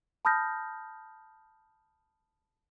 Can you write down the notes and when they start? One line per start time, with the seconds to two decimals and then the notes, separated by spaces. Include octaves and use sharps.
0.25 A5 B5 D#6 F6 G6 A#6